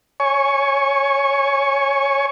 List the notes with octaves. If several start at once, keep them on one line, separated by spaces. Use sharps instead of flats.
C#5 G#5 C#6